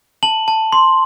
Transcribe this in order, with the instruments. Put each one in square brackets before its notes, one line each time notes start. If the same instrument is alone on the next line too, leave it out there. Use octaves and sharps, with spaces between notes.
[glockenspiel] A5 F#7
A5
C6